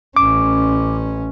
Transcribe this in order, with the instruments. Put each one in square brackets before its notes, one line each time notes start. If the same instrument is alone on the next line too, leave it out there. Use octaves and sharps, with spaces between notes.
[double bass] A1 C#4 [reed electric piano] D6